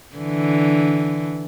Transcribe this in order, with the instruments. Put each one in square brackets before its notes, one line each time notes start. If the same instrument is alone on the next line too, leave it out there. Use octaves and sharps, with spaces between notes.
[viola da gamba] D3 E3